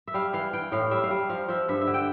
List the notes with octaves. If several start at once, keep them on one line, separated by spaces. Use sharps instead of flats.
E5
G3 F5
E3 F5
E3 G5
A2 F5
G3 E5
F5
G3
F3 F5
F3 E5
G2 E5
E5
D3
G5